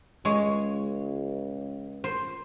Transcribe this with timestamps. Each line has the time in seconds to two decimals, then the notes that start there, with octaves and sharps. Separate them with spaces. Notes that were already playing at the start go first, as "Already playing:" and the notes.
0.25 C#2 G#3 C#5
2.04 C5